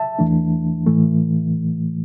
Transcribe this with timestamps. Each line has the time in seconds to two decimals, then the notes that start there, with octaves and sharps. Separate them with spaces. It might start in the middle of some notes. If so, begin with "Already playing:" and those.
Already playing: E5 A5
0.19 E2 E3 A3 D4
0.87 A2 E3 A3